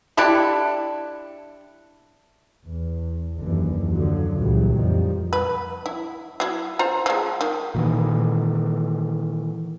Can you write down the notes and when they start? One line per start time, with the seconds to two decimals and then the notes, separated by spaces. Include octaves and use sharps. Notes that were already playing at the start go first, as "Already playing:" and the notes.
0.17 D4 E4 G4 A4
2.64 E2
3.38 F#1 D#2 D3 E3
3.90 D3 F3 F#3
4.37 C#2 A#2 E3 F#3 G3
4.73 F2 D#3 F3 G3
5.33 B4
5.86 E4
6.40 F#3 E4
6.79 F4 C5 A#5
7.06 F3 G#3
7.41 D#3
7.74 A#2 D#3 E3